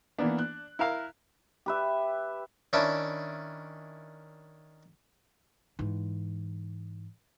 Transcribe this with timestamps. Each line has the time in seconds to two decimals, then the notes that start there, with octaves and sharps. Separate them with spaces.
0.18 E3 A#3 B3 D4
0.38 F#6
0.79 E4 A#4 F5
1.66 G4 B4 E5
2.73 D#3 C#4 D4 E4
5.79 G#2 E3